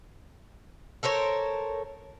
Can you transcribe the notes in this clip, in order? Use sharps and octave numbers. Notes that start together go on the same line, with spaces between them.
A4 A#4 C5 C#5